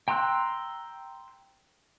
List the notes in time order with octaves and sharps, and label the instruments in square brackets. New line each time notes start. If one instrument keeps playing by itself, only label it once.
[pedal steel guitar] G5 A#5 C6 E6 F#6